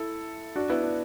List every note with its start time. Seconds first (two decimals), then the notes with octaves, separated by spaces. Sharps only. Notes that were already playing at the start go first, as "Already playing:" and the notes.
Already playing: E4 A4
0.56 D4 F#4
0.69 B3 E4
0.83 D4